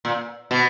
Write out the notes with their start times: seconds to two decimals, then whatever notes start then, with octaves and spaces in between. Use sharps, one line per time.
0.05 A#2
0.51 B2